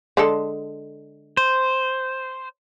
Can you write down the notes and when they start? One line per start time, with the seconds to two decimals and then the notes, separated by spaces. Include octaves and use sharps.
0.17 D3 G#3 A4
1.37 C5